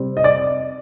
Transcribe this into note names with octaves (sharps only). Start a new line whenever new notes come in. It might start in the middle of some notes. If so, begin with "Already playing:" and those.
Already playing: C3 G3 C4
D#5
D5